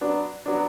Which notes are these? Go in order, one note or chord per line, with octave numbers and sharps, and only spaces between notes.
F#3 B3 D4
F#3 B3 D4